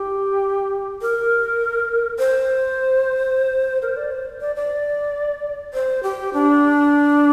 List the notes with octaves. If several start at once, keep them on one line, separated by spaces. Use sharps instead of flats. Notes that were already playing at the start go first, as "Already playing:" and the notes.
Already playing: G4
A#4
C5
A#4
C5
D5
C5
D5
D5
C5
G4
D4